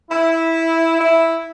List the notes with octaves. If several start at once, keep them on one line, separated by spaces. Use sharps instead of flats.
E4
E4